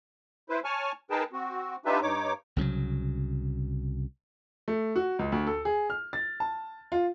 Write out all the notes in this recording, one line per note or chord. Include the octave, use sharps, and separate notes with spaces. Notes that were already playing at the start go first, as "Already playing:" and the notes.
E4 B4 C5
C#5 G#5 A5 C#6 F6
D#4 G#4 A#4 B4 G5 A5
C4 F#4
D4 D#4 F4 G4 B4 E5
G2 D#4 C#5 D6
C2 C#3 F3 F#3
A3
F#4
C#2
D2
A4
G#4
F6
A6
A5
F4